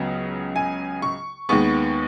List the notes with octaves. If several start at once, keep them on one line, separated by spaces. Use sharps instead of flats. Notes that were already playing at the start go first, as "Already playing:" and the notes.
Already playing: C#2 C#3 F#3 B3
G#5
C#6
D#2 D#3 G#3 B3 C#6